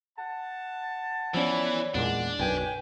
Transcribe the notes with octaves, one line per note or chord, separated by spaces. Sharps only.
F#5 A5
E3 F3 B3 C#4 C#5 D5
E2 A#2 G#3 D4 F#5
B1 F#2 B4 G5 G#5